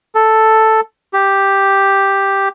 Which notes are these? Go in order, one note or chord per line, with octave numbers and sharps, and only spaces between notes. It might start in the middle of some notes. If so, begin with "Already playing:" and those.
A4
G4